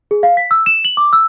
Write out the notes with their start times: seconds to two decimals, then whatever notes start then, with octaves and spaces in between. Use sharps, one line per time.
0.11 G#4
0.23 F5
0.37 B6
0.51 E6
0.66 E7
0.85 F#7
0.97 D6
1.13 E6